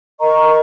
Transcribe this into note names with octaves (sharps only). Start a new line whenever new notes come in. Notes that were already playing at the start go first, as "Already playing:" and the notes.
A#4 D#5 A#5 C#6